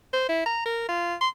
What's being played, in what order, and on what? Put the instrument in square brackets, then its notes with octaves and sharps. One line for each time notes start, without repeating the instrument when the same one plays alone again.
[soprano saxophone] C5
E4
A#5
A#4
F4
C6